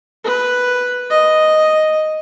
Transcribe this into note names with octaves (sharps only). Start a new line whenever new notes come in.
B4
D#5